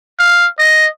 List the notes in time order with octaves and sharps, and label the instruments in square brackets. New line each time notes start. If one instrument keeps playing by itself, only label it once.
[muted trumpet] F5
D#5